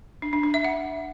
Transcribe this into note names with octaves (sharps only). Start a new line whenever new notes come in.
D4
D4
D4
E5
F#5